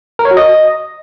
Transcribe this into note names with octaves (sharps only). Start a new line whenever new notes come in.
A#4
C#5
F#4
D#5